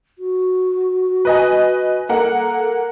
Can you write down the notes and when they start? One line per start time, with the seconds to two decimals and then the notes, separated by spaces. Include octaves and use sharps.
0.19 F#4
1.25 B4 D#5 G#5
2.09 A#3 A4 F#5